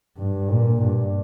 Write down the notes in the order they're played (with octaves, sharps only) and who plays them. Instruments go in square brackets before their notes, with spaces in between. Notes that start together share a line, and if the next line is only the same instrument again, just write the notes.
[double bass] G2
A#2
G2